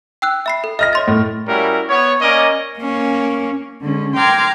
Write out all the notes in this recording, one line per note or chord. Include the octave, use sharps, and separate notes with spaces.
G5 E6 F#6
E5 B5 C7
A4
D#5 E5 F6 A#6
C#5 C6 A6
A2
G3 C#4 E4 F#4 A#4
B3 C#5
A#3 C#4 A#4 D5 D#5
A#3 C#4
D3 G#3 C#4
G5 A#5 C6 D6 F6 G#6